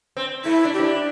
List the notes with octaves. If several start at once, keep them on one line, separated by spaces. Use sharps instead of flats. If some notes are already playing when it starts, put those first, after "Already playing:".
C4
A3 E4
D4
G4
C4
D4